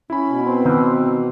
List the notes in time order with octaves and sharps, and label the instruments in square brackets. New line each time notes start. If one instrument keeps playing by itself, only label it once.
[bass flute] C#4 [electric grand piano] E4 B5
[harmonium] B2
[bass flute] C4
[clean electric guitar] D#3 E3